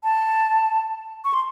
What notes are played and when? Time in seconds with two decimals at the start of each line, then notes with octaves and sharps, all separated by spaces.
0.04 A5
1.25 C#6
1.34 C6